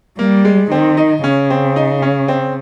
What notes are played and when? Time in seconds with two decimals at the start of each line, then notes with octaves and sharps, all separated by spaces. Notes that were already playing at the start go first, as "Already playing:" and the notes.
0.19 G3 A#3
0.45 G#3
0.71 D#3 C4
0.97 D#4
1.23 C#3 C#4
1.50 C4
1.76 D#4
2.02 C#4
2.28 C4